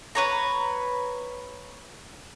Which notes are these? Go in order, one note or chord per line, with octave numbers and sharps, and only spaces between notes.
B4 C#5 A#5